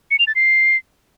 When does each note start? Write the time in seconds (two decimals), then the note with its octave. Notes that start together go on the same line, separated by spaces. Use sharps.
0.11 C#7
0.19 F7
0.27 A6
0.35 C7